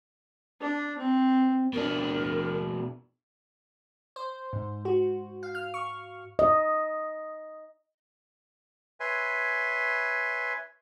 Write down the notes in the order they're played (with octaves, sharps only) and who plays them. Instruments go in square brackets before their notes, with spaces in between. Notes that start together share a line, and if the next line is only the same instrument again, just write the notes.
[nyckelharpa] D4
C4
[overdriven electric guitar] B2 D4 [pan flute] A#4
[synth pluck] C5
G#2
F#4
F5
F6
C#6
[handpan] D#5
[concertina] B4 C#5 E5 G#5 C6